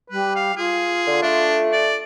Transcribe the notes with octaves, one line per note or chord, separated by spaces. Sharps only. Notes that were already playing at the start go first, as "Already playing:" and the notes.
G3 B4
F5
F4 G#4
D3
A3 D4
D5